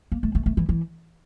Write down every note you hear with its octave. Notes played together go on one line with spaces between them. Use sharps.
A#3
A3
A3
A3
E3
E3